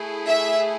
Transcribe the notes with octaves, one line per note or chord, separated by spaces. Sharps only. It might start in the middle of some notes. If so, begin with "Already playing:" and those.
Already playing: A3 E4 G#4
E5